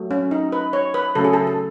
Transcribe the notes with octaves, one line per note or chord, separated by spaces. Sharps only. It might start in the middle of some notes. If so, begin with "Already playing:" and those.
Already playing: F#3 A3
C#4
D#4
B4
C#5
B4
C#3 F#3 A3 C#4 A4
G#4
A4
A4